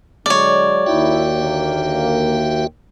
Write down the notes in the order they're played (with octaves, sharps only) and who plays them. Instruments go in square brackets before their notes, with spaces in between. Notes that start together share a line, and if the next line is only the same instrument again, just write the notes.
[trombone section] D3 F#3 G#3 [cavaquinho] C#5 D5
[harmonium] D#2 G5 [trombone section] D#4 E4 [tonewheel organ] F#4 E5
[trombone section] D3 A#3